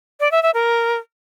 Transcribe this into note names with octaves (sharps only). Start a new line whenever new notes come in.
D5
E5
E5
A#4